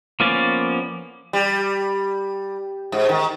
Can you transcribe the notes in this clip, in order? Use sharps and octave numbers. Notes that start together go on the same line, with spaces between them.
F3 A#3 B3 C#4 D5
G3
G#2
D#3